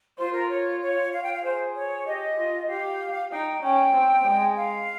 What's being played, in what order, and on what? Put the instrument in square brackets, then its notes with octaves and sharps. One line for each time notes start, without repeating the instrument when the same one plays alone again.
[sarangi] F4 [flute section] C5
[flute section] A#4
C#5
C#5
F5
G5
F5
[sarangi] G#4 [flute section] C5
[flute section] C#5
[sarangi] G4 [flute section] D#5
[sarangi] F4
[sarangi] G4 [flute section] F5
[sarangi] D#4 [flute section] G5
[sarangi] C#4 [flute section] G5
[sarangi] C4
G#3
[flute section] F5